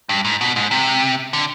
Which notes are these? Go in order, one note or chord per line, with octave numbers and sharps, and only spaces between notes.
G2
G#2
B2
G#2
C3
D3